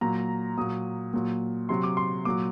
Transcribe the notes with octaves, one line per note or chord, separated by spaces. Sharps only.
A#2 F#3 A#5
A#2 F#3 D#6
A#2 F#3
C3 F#3 C6
D6
C6
A#2 F#3 D6